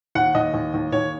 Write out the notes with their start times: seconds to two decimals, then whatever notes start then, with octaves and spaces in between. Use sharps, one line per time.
0.15 D#2 F#5
0.35 D#2 D#5
0.54 D#2
0.74 D#2
0.92 D#2 C#5